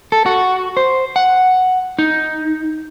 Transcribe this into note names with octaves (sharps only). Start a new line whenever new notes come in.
A4
F#4
C5
F#5
D#4